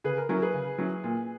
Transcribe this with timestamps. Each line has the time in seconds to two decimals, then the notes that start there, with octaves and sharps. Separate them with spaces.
0.04 C#3 G#4 B4
0.17 A#4
0.29 F#3 C#4 E4 A#4
0.42 G#4 B4
0.54 C#3
0.78 F#3 C#4 E4
1.04 A#2